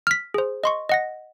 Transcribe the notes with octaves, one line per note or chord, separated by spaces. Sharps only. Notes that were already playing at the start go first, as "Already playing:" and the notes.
F6 B6
G#4 C5
D#5 C6 C#6
D#5 F#5 A#6